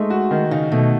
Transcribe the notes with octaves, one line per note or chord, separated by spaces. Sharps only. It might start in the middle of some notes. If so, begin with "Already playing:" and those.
Already playing: G#3 A3 D#4
F#4
D#3
C#3 D#4
B2 A3